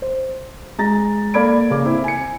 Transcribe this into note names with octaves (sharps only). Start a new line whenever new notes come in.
C5
G#3 A#5 A6 A#6
A#3 A4 D5 B5 G#6 D7
C#3 A#3 D6
C4 E4
G#5 C#7